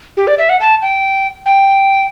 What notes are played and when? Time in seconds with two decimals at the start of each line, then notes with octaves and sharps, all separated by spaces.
0.17 G4
0.27 D5
0.39 E5
0.49 F#5
0.60 A5
0.82 G5
1.46 G5